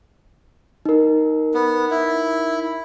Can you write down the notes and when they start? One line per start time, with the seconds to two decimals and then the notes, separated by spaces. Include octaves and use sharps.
0.85 D#4 A#4
1.54 B3
1.91 E4